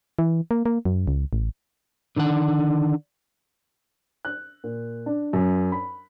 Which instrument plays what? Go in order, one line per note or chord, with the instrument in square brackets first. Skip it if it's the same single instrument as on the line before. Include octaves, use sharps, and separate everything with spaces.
[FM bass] E3
A#3
A#3
F#2
C#2
A1
[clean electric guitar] D3 D#3 D4 F#5
[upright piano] F#6
A#2
D4
F#2
B5